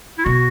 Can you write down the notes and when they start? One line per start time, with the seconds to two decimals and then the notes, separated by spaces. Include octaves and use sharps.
0.18 E4
0.25 B2 F#4